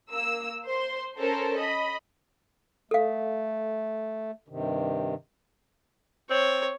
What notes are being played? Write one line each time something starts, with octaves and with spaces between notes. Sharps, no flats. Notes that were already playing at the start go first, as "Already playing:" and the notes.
A#3 E6
C5 C6
C#4 A4 A#4 C5
D#5 B5
A3 A4 F5
G2 C3 D#3
C4 C#5